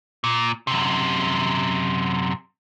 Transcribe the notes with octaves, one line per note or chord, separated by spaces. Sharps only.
A#2
F#2 C3